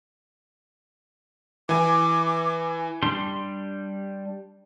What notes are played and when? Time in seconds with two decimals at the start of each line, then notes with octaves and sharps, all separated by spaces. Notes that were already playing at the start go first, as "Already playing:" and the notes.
1.69 E3 G#5 D6
3.03 G3 D4 C6